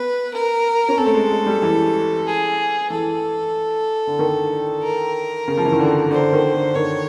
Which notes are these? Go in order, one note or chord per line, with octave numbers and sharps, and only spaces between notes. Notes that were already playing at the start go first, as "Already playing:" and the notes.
Already playing: B3 B4
A#4
C#4
C4 A4
A3
G#3
G#3
G3
E3
G#4
E3 A4
D3
D#3
A#4
C#3
F3
E3
D#3
D3
D3 C5
D#3
D3
D#3 C#5